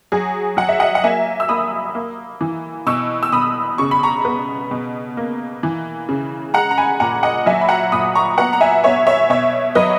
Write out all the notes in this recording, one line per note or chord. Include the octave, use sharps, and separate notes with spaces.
F#3 G#4
F#3 F#5
E5
D#5 F#5
F#5
A#3 E5 G#5
E6
A#3 B5 D#6
A#3
E3
B2 C#6 E6
E6
B2 B5 D#6
C#3 C#6
B5
A#5 C#6
B3
B2
A#3
E3
C#3
G#3 F#5 A#5
A#5
G#5 B5
A#2 F#5 A#5
D#5 F#5
F#3 E5 G#5
B5
F#5 A#5
A#2 B5 D#6
A#5 C#6
B3 F#5 A#5
A#5
E5 G#5
B3 C#5 E5
C#5 E5
B2 C#5 E5
F#3 B4 D#5